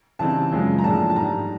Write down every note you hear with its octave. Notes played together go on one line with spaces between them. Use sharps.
C#3 E3 G3 C4 D#4 A5
F#2 C#3 F3 G#3 C#4
A#5
A2 F3 A#3 D4 A5
A5
G#2 D#3 G3 A#5